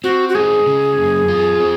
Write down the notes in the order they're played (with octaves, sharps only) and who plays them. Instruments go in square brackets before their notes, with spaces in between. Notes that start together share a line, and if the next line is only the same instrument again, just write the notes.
[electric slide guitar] C4 [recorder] F#4
[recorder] F#4
[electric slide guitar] G#3 [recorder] G#4
[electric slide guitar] C#3
F#2
F4
C4